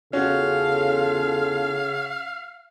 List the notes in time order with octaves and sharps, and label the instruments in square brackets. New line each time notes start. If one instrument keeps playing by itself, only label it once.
[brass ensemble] E2 F4 A4 [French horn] C#3 [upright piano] C#4 F#4 [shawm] F5